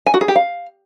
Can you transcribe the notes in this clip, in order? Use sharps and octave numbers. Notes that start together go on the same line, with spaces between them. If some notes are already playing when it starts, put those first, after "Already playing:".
G#5
F#4
G#4
G4
F5